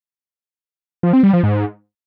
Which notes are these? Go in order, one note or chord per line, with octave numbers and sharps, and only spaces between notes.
F3
C4
G3
F3
G#2